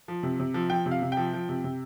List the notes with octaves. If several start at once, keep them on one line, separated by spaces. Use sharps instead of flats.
F3
C3
C3
F3
F3 G5
C3
F5
C3
F3 G5
F3
C3
C3